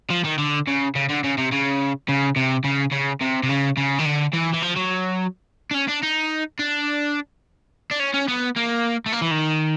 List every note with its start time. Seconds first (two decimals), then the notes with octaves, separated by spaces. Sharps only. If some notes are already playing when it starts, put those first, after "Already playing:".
0.11 F3
0.25 D#3
0.38 D3
0.67 C#3
0.95 C#3
1.10 D3
1.24 C#3
1.38 C3
1.52 C#3
2.09 C#3
2.36 C3
2.64 C#3
2.92 C#3
3.21 C3
3.43 C3
3.49 C#3
3.77 C#3
3.99 D#3
4.06 D3
4.33 E3
4.53 E3
4.62 F3
4.76 F#3
5.71 D4
5.74 C#4
5.89 D4
6.03 D#4
6.59 D4
7.91 D4
8.00 C#4
8.14 C#4
8.28 B3
8.56 A#3
9.06 A3
9.12 A#3
9.22 E3
9.31 D#3